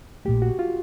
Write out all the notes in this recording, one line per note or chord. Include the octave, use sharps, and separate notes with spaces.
A#1 A#2 F#3 A3 G4
F#4
F4